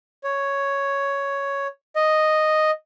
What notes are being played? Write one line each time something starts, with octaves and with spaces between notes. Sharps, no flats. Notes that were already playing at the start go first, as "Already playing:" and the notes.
C#5
D#5